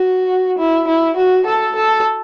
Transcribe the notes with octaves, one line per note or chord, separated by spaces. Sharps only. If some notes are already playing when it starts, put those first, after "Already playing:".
Already playing: F#4
E4
E4
F#4
A4
A4